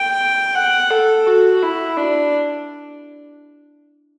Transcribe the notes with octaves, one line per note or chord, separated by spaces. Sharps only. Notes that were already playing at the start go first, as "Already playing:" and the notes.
Already playing: G5
F#5
A4
F#4
E4
D4